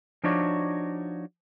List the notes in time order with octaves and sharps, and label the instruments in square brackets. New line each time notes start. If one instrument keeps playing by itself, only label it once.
[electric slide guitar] F3 D4 D#4 F#4 C#5 D5